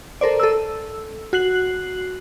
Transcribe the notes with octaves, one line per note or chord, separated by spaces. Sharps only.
A4 A#4 C5 D5
A4 E6
F#4 F#6 C7 F#7